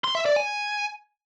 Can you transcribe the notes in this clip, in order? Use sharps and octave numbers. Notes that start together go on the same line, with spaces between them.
C6
E5
D5
G#5